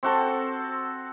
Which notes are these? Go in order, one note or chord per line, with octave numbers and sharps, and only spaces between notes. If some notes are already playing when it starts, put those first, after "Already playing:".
C4 F#4 A4